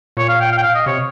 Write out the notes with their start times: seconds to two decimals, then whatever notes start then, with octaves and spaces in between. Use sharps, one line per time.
0.17 A#2 C#5
0.29 F5
0.41 G5
0.52 F5
0.58 G5
0.63 F5
0.75 D#5
0.86 C3 C#5